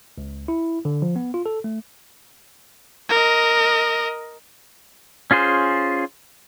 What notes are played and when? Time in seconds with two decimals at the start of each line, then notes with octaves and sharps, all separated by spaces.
0.18 C#2
0.48 E4
0.85 D3
1.02 F3
1.16 B3
1.34 F4
1.46 A4
1.64 A3
3.09 A#4 D#5
5.31 C#4 F4 G#4 C5